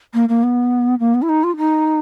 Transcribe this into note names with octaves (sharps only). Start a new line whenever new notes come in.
A#3
A#3
B3
A#3
B3
E4
D#4
F4
D#4